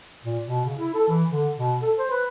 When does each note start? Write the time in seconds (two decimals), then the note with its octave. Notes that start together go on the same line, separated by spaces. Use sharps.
0.25 A#2
0.44 B2
0.66 C#3
0.78 E4
0.95 A4
1.08 E3
1.30 D3
1.56 B2
1.82 A4
1.98 C5
2.11 B4